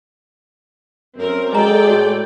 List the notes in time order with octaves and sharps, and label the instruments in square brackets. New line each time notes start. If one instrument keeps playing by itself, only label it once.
[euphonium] F#2 [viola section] C4 A#4
[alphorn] G#3 [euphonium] F#4 [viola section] A4 D5 G5 [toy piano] G#5 A#5
[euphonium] A2 [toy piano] F#4